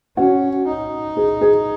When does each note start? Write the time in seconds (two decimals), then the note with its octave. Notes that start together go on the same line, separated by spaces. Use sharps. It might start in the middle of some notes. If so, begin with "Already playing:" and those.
0.17 C#4 F#4
0.67 D#4
1.17 G#4
1.41 G#4